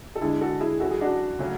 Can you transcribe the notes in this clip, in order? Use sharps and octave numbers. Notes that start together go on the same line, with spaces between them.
A4
D3 G#3 D4 E4 G#4
F#4 A4
E4 G#4
F#3 C#4 E4 F#4 A4
G#4
D4 F#4
C#3 F#3 A3 C#4